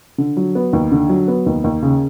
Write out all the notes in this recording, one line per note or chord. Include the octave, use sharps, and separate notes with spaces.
D3
F#3
B3
D#2
D3
F#3
B3
D#2
D#2
C#3